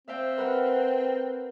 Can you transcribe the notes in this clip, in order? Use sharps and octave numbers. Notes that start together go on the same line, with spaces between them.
C4 E5 F5 G5
A#4 B4 F#5